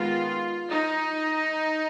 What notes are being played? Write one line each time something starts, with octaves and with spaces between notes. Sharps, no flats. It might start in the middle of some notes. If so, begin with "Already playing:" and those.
Already playing: D#3 G#3 B3 F4
D#4